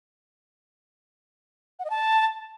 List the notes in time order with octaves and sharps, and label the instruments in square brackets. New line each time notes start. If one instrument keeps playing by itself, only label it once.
[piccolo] F#5
D#5
A5